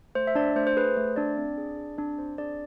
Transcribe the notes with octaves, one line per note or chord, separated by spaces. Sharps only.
A3 C5
E5
D4 D5
A3 C5
C5
G#4 B4
A3 C5
D4 D5
C4
G#4
G#4
C4 D4 D5
C4 C5
D4 G#4 D5